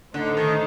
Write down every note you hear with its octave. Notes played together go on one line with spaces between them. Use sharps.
A2 D3 A3 D#4 A4 C5
D#3